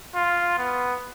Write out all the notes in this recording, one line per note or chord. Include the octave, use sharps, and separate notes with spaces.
F4
B3